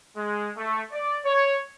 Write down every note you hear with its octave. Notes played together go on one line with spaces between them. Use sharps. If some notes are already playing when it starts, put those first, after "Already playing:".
G#3
A3
D5
C#5